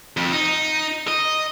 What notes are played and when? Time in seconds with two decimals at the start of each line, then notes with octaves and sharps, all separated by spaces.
0.17 F2
0.32 D#4
1.08 D#5